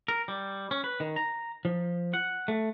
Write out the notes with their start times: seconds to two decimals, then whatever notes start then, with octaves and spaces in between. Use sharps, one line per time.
0.08 A#4
0.28 G3
0.71 C#4
0.84 B4
1.00 D#3
1.16 A#5
1.65 F3
2.14 F#5
2.48 A3